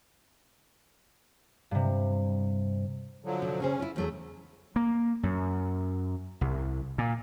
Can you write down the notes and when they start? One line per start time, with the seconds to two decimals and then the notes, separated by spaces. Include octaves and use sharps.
1.71 G2 C3
3.25 D3 F3 F#3
3.42 C3
3.60 C#3 C#4 G#4 C5
3.79 E4 F4
3.96 E2 F#3 A3 G#4
4.76 A#3
5.23 F#2
6.41 C2
6.98 A#2